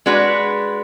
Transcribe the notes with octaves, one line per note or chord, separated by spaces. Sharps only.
G#3 D4 F#4 B4